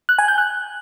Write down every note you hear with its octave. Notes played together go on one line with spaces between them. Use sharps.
F#6
G#5
G6
F#6